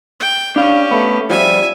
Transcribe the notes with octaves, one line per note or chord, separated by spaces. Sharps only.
G5
C#4 D4 G4 F5
A3 B3
F3 G3 E5 G#5